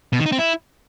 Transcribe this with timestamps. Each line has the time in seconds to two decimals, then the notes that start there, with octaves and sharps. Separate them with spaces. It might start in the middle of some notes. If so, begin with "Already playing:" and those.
0.13 B2
0.19 D#3
0.26 D#4
0.32 C4
0.39 E4